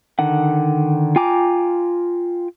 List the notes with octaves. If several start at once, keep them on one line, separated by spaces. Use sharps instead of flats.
D3 D#3 F#5
F4 G5 G#5 A#5 D6